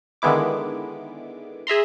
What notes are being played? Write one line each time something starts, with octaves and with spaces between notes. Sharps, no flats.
D3 D#3 G#3 B3 E4 D6
G#4 E5 A#5 C6